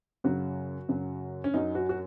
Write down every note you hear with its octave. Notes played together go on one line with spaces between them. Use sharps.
F#2 C#3 F#3 F#4
F#2 C#3 F#3
C#4
F#2 F#3 D#4
F#4
F#4